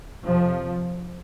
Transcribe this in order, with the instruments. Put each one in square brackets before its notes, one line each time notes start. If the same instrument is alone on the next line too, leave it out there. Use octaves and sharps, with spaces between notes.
[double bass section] F2 C3 F3